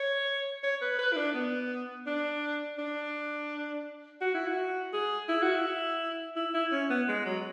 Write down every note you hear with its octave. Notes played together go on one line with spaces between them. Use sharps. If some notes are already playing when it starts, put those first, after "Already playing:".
Already playing: C#5
C#5
B4
B4
E4
D4
B3
D4
D4
F#4
E4
F#4
G#4
E4
F#4
E4
E4
E4
C#4
B3
G#3
F#3